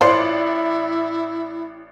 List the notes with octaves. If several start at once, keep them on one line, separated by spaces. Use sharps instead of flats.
A1 E4 F4 C5 D5 C7